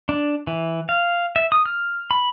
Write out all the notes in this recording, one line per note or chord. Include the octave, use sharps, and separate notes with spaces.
D4
E3
F5
E5
D#6
F6
B5